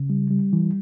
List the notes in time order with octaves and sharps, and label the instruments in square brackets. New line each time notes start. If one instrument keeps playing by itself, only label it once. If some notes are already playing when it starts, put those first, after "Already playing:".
Already playing: [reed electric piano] C#3
G3
G3
E3